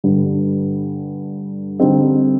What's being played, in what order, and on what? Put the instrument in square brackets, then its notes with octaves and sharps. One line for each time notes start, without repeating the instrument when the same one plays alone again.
[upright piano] G2 D3 G3
D3 G3 C4 D#4